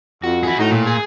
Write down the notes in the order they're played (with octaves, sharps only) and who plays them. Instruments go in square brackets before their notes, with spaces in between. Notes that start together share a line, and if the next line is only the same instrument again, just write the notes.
[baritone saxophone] F2 [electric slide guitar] F#4
[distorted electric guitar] E4 G#4
[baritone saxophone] A2 [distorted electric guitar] D#4
[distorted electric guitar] A#2
[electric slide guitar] G#4